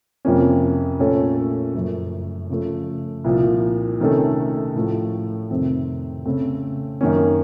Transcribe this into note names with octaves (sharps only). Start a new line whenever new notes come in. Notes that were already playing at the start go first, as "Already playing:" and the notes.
F2 C3 F3 A#3 C#4
A#2 A3 C#4 A4 C#5
F#1 F#2 F3 A3
C#3 F3 A3
C2 A#2 F3
C3 D#3 A3 C#4 A4
A2 F3 A3
F2 C3 D#3 A3 C4
C#3 A3 C4
F#2 D#3 A#3 C#4